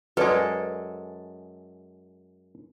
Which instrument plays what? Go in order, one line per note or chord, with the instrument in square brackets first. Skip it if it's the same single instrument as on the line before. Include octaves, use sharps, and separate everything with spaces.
[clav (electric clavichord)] F#2 G#3 [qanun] A4 [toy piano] B4 D5 G#5